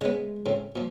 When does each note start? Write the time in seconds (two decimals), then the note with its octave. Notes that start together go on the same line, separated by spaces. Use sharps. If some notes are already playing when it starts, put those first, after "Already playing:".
0.01 C#3 G#3 B3
0.46 A2 C#3 C4
0.76 A#2 F3